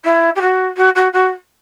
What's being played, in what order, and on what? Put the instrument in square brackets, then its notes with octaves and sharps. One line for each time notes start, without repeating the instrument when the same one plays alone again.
[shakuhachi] E4
G4
F#4
F#4
F#4
F#4